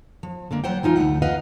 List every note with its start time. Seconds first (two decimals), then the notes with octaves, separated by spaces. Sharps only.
0.23 F3
0.51 D3 G#3 A#3
0.64 F#3 C5 F#5 G5
0.83 E3 G#3 D#4 F4
0.96 D2 C3 A3 F#5
1.22 B4 D#5 F5 F#5